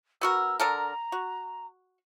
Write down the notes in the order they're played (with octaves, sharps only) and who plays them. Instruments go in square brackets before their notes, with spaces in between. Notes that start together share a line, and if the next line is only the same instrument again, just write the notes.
[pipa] B3 F#4 A#4 [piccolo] E6
[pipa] D3 A4 A#4 [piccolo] A#5
[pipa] F#4